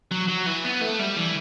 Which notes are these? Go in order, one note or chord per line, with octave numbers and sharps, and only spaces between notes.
F#3
F#3
E3
B3
A3
G3
E3